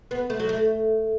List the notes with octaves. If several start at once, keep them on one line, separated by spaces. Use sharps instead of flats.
B3
A3
F#3
A3